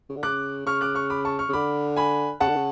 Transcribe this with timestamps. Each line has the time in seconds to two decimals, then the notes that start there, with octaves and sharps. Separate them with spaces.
0.09 C#3
0.16 D3
0.23 C#3 D6 F#6
0.66 C#3 C#6 F6
0.81 D6 F#6
0.95 C#6 F6
1.10 B5 D6
1.25 A5 C#6
1.39 C#6 F6
1.49 C#3
1.53 D3 B5 D6
1.96 G#5 B5
2.40 C#3 F#5 A5
2.48 D3
2.56 C#3